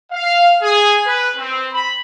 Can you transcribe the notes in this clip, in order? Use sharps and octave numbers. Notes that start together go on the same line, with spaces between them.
F5
G#4
B4
C4
B5